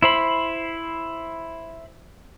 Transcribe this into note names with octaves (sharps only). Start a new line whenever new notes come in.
E4 C5 B5